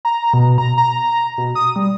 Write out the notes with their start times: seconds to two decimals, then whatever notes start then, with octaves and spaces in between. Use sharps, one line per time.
0.05 A#5
0.34 B2
0.58 A#5
0.78 A#5
1.38 B2
1.55 D#6
1.76 G3